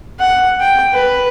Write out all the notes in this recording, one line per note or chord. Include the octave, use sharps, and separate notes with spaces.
F#5
G5
B4